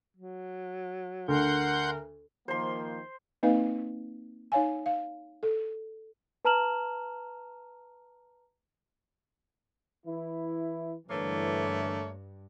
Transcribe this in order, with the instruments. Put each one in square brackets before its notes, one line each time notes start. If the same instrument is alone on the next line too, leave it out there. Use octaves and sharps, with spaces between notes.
[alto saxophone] F#3
[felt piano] D2 [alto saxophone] A#4 [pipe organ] F#5 C6 G6
[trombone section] D#3 F3 A#3 [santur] C5 C6
[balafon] A#3 C4 D#4 B4 D#5 F5
D#4 C#5 F5 G#5
F5
A4
[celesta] B4 A5 A#5 F6 E7 F#7
[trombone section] E3 E4
[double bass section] G2 [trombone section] D3 E3 [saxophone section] A3 A#3 C#5